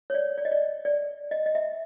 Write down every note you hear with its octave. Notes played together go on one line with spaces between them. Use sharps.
C#5
D5
D5
D#5
D5
D5
D#5
D#5
E5